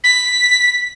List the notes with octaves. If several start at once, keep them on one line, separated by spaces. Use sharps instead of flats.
B6